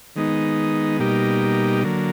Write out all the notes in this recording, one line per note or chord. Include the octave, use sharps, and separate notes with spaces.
D#3 G#3 B3 D#4
B2 G3 A#3 D#4 G4
D3 F#3 A#3